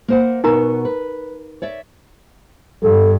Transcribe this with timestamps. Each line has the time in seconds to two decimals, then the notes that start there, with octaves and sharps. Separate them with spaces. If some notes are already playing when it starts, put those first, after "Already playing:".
0.08 A#3 C5 F#5
0.44 B2 B3 D#4 A#4 C#5 A#5
0.85 B4
1.62 C#5 D5 E5
2.83 G2 A4